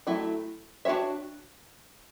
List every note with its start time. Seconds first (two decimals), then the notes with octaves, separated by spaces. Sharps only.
0.07 F#3 A3 E4
0.85 D4 F#4 C#5 E5